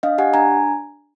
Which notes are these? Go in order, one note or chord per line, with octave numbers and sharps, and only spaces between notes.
D4 D#5 F5
G4 F#5 G#5
D4 G#5 A#5